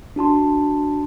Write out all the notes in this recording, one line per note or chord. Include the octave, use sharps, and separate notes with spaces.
D4 F#4 A5 C6